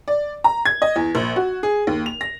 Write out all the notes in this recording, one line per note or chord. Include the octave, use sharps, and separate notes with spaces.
D5
A#5
G#6
D#5
E2
A#1
F#4
G#4
D#2
F7
A#6